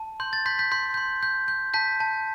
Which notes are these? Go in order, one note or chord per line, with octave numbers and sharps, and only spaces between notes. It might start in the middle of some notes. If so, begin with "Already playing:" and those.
Already playing: A5
C6 G6
A6
C6 G6 B6
G6 B6
C6 G6
C6 G6
G6
G6
A5 G6 B6
A5